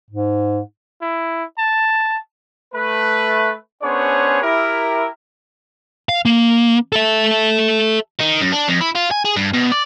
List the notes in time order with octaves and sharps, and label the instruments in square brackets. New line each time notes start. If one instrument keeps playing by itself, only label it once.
[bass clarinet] G#2
[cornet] E4
A5
[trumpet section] A3 B4
B3 C#4 D4 G#4 C5 C#5
E4 G4 A#4
[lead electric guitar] F5
A#3
A4 E5
[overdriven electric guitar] D#3
F#2
D4
F2
E4
F4
G#5
G#4
G2
B2
D5